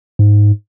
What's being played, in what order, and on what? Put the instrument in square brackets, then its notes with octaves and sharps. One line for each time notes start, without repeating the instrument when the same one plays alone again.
[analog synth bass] G#2